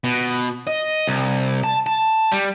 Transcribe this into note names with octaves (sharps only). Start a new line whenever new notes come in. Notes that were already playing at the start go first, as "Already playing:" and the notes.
B2
D#5
C2
A5
A5
G3